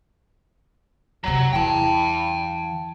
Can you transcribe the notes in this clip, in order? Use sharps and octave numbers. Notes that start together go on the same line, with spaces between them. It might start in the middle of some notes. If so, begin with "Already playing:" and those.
F2 C3 F#3
E2 E3 G5 A5